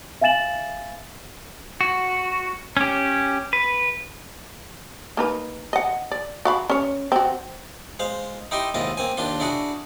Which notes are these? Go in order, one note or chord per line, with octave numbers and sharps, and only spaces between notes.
E5 F5 G#5 A6 E7 F#7
F#4
C#4 G4
B4
A#3 D#4 B4
D#5 F#5
D5
F#4 F5 B5
C#4 C#5
C4 F#4
G#3 C5 F5
D#4 E4 G4 D#5 C6
D#2 G#2 E4 F4 D#5
A#3 C4 G#5
D#2 D4 F4 C6
D4 E4 F#4 G#4